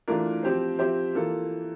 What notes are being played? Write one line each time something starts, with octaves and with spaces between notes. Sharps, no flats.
E3 A3 D4 F4 A#4
F3 C4 G4 C5
F3 C4 G4 C5 E5
E3 A#3 F4 A4